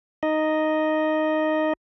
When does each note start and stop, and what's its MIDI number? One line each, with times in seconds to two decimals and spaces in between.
0.23 1.73 63
0.23 1.73 75